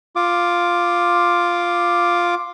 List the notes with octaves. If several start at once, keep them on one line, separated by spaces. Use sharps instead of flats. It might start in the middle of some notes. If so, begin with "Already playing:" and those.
F4 D6